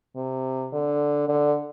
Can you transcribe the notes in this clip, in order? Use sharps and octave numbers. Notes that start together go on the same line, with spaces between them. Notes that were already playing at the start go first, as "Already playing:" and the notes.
C3
D3
D3